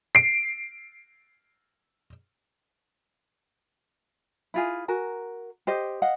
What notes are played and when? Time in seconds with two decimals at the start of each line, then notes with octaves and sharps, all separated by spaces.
0.15 C7 D7
4.54 E4 F4 G#4
4.88 F#4 A#4 G#5
5.67 G4 C5 D#5
6.02 D#5 F5 F#5